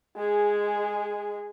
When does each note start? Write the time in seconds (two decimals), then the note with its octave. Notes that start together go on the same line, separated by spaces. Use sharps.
0.17 G#3 G#4